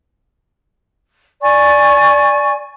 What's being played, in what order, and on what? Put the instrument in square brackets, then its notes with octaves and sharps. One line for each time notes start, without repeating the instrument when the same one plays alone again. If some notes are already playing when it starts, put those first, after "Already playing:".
[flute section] D5 G#5 C#6